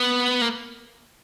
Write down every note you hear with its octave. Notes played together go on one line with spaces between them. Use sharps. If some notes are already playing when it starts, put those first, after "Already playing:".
Already playing: B3
A#3